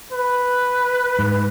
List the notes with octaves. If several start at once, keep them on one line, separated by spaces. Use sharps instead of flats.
B4
G#2